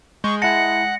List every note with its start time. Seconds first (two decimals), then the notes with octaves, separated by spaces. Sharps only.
0.24 G#3 C#6 G6
0.42 E4 F#5 A5 A#6 C#7